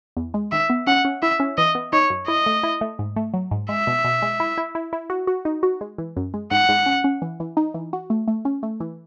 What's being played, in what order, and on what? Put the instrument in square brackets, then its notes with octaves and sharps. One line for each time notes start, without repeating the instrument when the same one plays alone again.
[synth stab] E2
G#3
[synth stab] D#3 [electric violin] E5
[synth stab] B3
[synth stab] C#4 [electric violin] F#5
[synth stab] C#4
[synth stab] E4 [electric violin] E5
[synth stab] C#4
[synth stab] E3 [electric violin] D#5
[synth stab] B3
[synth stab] D#4 [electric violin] C#5
[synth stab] F#2
[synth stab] E4 [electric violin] D#5
[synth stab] A3
E4
A3
G#2
A3
F#3
G#2
[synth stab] G#3 [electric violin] E5
[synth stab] B2
B2
G#3
E4
E4
E4
E4
F#4
F#4
D#4
F#4
G#3
E3
F#2
G#3
[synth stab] G#2 [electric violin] F#5
[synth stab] G#2
C#4
C#4
E3
E3
D#4
E3
F#4
A3
A3
C#4
A3
E3